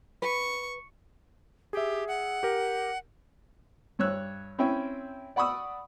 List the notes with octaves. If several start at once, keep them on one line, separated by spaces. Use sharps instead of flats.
B4 C#6
G4 G#4 E5
F#5
G4 A#4
G2 C#5 E6 F#6
C4 C#4 E4 G5
D5 F#5 B5 C#6 D#6 E6